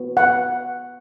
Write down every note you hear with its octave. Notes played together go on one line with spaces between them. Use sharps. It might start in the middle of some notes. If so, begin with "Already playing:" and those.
Already playing: B3 F#4
F#5